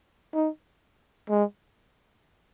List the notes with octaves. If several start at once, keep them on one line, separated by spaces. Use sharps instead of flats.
D#4
G#3